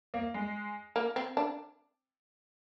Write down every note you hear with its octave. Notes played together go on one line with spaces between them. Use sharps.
A#3
G#3
A#3
C4
D4